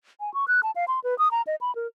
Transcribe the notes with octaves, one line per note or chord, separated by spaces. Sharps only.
G#5
C#6
F#6
A5
F5
C6
B4
D#6
A#5
D#5
B5
A#4